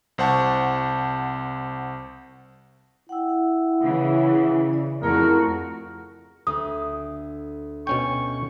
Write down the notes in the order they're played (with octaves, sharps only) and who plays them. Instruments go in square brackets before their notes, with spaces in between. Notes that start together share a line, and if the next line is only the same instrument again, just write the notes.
[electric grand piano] C2 C5 F#5 A5 C#6
[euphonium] E4 [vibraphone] F#5 G5 E6
[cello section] C#3 E3
[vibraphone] D5
[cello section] F2 F#4 [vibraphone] A3 E4 G#4 [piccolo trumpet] A#4
[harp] D2 [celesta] D#6
[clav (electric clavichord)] B2 C#4 G5 [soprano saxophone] C#6